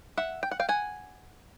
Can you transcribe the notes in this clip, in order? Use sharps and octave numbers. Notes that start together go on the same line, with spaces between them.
E5 F#5
G5
F#5
F5 G5
F#5 G#5